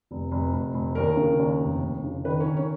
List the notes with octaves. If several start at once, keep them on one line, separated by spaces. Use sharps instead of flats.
F1
F1
F1
F1
D#2 A#4
C#3
D#2
F1
F1
C#3
D#3 B4
C#4 C#5
D#3
C#4 C#5